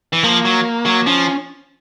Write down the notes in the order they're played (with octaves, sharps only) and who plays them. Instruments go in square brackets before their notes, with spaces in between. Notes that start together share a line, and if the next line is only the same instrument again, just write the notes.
[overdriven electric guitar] E3
[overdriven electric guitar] F3 [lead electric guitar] A#3
[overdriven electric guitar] F#3
F#3
[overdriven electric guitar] F3 [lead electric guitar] C#4